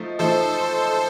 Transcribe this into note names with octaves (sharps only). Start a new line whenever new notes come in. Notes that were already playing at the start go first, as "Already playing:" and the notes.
Already playing: F3 A3 D#4
F3 A3 D#4 A4 C5